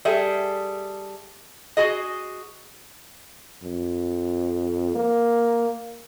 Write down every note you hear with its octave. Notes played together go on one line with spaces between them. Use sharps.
G3 G#4 A4 E5
F#4 G#4 D#5
F2
A#3